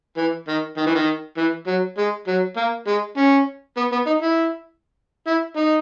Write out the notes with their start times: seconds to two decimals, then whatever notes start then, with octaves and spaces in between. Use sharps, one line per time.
0.17 E3
0.48 D#3
0.77 D#3
0.86 E3
0.95 D#3
1.37 E3
1.67 F#3
1.98 G#3
2.27 F#3
2.57 A#3
2.87 G#3
3.17 C#4
3.77 B3
3.92 B3
4.07 D#4
4.22 E4
5.27 E4
5.57 D#4